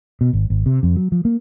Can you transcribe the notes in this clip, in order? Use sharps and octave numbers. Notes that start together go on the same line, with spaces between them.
B2
G#1
G#1
C3
F2
F#3
F3
A#3